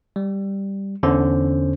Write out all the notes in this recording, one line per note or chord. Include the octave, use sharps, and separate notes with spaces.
G3
E2 D3 C#4 C5